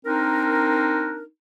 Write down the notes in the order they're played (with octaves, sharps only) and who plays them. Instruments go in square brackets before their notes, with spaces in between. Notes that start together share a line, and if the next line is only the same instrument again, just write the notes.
[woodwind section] C4 D4 D#4 A#4